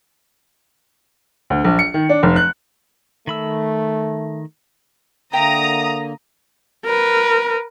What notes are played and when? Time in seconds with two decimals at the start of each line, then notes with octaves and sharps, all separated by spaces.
1.50 D2
1.64 A#1
1.79 C#7
1.94 D#3
2.09 D4
2.23 F1
2.36 F#6
3.27 D#3 A3 B5 E6
5.33 D3 A#3 E5 G5 A#5 D#6
6.85 A#4 B4